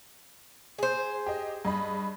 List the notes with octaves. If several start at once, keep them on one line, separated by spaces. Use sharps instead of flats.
G#4 C5
G4 D#5
G2 D#5 B5